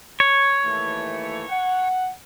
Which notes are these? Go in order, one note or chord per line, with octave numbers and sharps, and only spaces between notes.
C#5
D#2 E3 A3
F#5